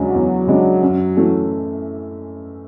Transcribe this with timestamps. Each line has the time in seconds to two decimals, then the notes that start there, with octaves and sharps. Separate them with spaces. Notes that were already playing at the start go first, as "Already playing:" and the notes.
Already playing: E2 C#3 F#3 G#3 D4
0.14 E2
0.47 C#3 G#3 D4
0.82 F#2
1.16 E3 A3 C#4